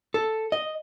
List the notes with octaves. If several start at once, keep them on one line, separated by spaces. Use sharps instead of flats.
A4
D#5